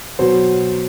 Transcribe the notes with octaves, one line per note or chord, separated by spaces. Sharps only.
B2 F#3 B3 F#4 C5